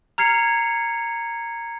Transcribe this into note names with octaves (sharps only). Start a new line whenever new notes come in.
A#5 F6 G#6 C7 C#7 F7